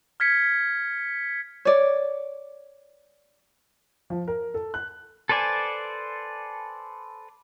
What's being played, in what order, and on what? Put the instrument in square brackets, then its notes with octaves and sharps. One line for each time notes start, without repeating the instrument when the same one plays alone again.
[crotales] F6 G#6 B6 C#7
[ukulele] C#5 D5
[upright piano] F3
A#4
A4
F#6
[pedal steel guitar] A4 B4 C5 D5 G#5